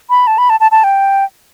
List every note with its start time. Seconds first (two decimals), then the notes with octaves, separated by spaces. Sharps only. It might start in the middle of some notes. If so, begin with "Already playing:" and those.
0.10 B5
0.27 A5
0.38 B5
0.50 A5
0.60 A5
0.71 A5
0.84 G5